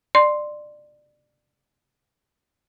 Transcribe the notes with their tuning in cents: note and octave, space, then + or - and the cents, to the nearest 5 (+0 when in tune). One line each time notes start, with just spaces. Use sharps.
D5 +25 C6 +0